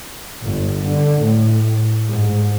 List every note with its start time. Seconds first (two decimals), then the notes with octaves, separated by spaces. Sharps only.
0.42 G1
0.87 D3
1.21 A2
2.08 G#2